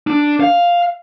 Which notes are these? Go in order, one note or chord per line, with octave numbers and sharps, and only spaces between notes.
D4
F5